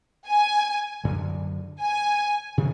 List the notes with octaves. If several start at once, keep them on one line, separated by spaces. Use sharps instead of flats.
G#5
F#2 D3 F#3
G#5
C3 D#3